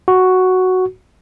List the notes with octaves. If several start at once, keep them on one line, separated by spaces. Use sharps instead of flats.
F#4